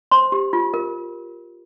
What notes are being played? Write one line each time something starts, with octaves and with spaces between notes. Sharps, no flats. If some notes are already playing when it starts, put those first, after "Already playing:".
C5 C6
G4
F4
A#4